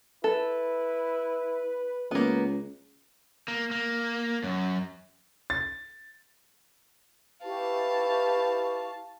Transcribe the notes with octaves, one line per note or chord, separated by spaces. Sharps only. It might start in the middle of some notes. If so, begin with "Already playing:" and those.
E4 A4 B4
C#2 A#3 B3
A#3
A#3
F#2
A6
E4 G4 B4 F5 A5 C#6